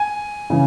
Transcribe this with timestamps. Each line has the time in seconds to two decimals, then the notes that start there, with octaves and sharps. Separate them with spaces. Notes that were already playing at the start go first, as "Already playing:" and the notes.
Already playing: G#5
0.50 C#3 E3